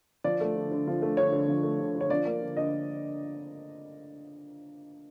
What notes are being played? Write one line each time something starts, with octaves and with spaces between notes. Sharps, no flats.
F3 D5
A3
D3
D3
F3
A3
D3 C#5
D3
F3
A3
D3
D3
C#5
F3 D5
A#3
D3
D3 D#5